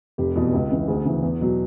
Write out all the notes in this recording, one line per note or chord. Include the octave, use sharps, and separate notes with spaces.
F1 G4
E2 B2
C#2
C#3 E3
D2 G#4
C#3 E3
E2
B2 F#3